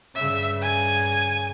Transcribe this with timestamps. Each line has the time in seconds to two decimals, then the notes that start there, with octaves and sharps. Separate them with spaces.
0.15 G2 C#3 E5
0.62 G#5